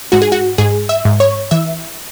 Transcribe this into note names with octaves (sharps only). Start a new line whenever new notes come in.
G#2 F#4
G#4
F#4
G#2 G#4
E5
G#2
C#5
E3 E5